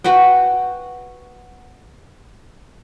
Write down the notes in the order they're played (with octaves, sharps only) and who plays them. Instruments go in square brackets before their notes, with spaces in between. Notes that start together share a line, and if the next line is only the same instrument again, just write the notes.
[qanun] F#4 B4 F#5 G5